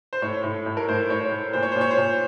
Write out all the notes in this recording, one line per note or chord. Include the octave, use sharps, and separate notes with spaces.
C5
A2 C#5
A2
A2
A#4
A2 C5
A2 C#5
C5
A2
A#2 C5
C#5
A#2 C5
C#5
C5
A#2